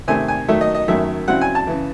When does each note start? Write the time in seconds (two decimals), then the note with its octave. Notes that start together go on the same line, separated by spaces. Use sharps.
0.08 C3 D#3 A3 C4 G#5
0.28 G#5
0.48 D#3 F#3 A3 E5
0.61 D#5
0.75 D#5
0.88 F#2 D#3 F#3 A3 E5
1.28 C#3 F#3 C4 E4 F#5
1.41 G#5
1.55 A5
1.67 C#3 E3